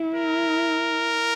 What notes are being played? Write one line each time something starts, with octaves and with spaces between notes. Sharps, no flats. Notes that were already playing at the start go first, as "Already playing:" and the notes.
Already playing: E4
A#4